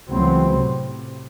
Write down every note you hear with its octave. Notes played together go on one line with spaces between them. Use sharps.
C#2 E3 F#3 A3 B3 C4
A2 C3